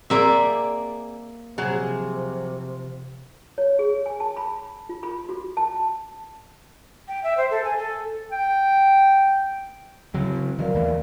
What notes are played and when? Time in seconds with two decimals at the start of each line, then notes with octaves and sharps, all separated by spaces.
0.10 A#3 C4 G#4 D5 E5
1.58 C3 F3 F#3 G#4
3.58 C#5
3.79 G#4
4.06 G#5
4.20 A5
4.37 B5
4.89 F4
5.03 B5
5.29 F#4
5.57 A5
7.08 G5
7.23 E5
7.37 C5
7.51 A4
7.64 G#5
7.78 A4
8.32 G5
10.14 C#3 F#3 C4 E4 F#4
10.59 D#3 F#3 A#4 D5 F5
10.74 D#2 E3 A3